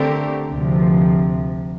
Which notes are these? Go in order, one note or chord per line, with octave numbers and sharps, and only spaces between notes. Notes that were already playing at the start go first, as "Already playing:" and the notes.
Already playing: D3 A3 C4 G4 A#4
D2 C3 F3